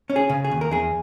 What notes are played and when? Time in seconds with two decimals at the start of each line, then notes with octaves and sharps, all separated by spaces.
0.10 C#4
0.16 G#4
0.29 C#3
0.44 G#4
0.51 D#2
0.61 A#4
0.71 E2 G#4